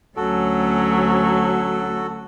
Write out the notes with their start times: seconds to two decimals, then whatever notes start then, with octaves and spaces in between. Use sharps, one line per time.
0.17 D2 F#3 C#4 F#4 A4